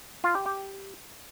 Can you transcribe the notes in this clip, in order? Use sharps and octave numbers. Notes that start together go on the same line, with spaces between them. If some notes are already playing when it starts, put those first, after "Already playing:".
F4
G4
G4